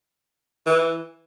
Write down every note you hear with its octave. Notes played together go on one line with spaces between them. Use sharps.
E3